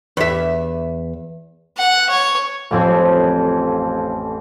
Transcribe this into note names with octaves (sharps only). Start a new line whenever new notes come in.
E2 E5
F#5
C#5
A1 F2 C4